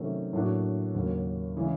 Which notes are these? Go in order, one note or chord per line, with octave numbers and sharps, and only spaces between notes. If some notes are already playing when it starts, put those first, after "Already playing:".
Already playing: C3 D#3 F#3 A3 C#4
A2 F#3 A#3 D4 F#4
D#2 C#3 F#3 A#3
C#3 E3 G#3